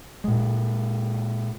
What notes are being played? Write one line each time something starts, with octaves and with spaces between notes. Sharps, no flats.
A#2 G#3